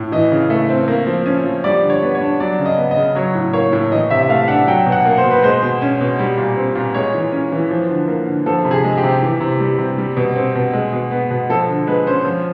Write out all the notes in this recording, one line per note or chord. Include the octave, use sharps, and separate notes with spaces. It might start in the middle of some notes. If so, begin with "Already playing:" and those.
Already playing: A2
E3 D#5
C#3
A3
C4
A#3
F3
C#4
F3
G3 D5
D3
C#5
B3
C#5
D4
F#3 D5
C#3
D#5
B3
D#5
C#3
F#3 C#5
A2
A#3 C#5
A2
E3 D#5
C3 E5
A3 F5
D4 F#5
F#3 G5
B2
F#5
A#3
C5
B2
B4
G#3 C5
B2
C#4
B2
G3
A#2
C4
A#2
G#3 C#5
E3
C#4
E3
F3
D3
A#3
D3
F3 A4
C3
G#4
G#3
G4
C3
E3
C3
G3
C3
G3
B2
C4
B2
G#3
B2
B3
B2
F3 A4
D3
G#3 B4
C#4 C5
F3